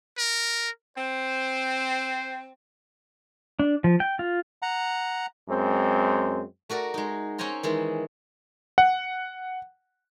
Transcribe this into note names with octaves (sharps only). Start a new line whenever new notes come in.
A#4
C4 C5
D4
F3
G5
F4
F#5 A#5
F#2 G#3 C4
A3 F#4 A#4 D5
G#3 D#4
C4 C#4 G5 G#5 A#5 C6
D#3 E3 G#3
F#5